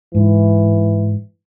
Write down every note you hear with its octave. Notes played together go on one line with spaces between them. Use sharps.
G#2 E3